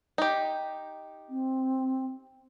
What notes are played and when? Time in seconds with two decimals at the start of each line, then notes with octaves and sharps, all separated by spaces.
0.18 D#4 G4
1.29 C4